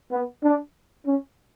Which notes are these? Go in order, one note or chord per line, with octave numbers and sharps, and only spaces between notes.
B3
D4
C#4